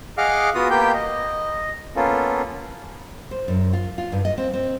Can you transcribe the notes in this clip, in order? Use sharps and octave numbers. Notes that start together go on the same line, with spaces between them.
G#4 D#5 F5 F#5 D6 F6
B3 F4 F#4 D#6
A#3 B3 G4 G5 G6
D#5
A#3 B3 C#4 F4 A4
C5
F#2
F4
F4
G2
D#5
C4
C4